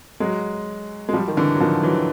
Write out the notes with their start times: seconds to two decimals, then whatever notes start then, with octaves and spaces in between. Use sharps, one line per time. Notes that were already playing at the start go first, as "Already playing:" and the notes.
0.20 F#3 G#3
1.09 G#3
1.13 F3 G3
1.28 D#3
1.37 D3 E3
1.55 F#3
1.60 D#3 F3
1.83 E3 F#3